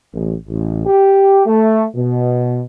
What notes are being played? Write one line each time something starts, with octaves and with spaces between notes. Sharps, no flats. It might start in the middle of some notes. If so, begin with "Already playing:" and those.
A1
A1
G4
A3
B2